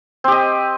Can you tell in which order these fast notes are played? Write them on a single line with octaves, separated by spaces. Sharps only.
C4 G4 D#5